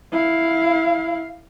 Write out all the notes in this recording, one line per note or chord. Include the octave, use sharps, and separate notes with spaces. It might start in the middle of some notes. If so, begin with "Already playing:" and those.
E4 F5